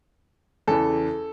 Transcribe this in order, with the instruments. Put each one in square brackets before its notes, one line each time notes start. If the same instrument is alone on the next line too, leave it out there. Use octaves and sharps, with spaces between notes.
[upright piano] E2 C#3 E3 A4